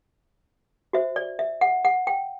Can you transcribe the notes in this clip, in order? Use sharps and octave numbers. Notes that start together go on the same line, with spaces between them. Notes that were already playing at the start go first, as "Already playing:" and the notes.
F#4 C5 E5
D5
E5
F#5
F#5
G5